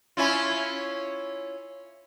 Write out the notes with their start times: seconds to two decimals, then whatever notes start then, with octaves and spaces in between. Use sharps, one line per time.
0.17 C#4 E4 F4